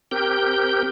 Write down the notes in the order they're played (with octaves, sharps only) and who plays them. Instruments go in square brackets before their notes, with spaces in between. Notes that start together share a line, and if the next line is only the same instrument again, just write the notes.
[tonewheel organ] C4 G4 A#4 G6